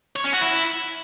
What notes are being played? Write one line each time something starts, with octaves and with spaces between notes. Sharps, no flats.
C#5
C#4
F#4
E4